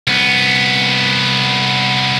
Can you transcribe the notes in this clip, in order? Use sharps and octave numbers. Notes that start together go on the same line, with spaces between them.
C2 B3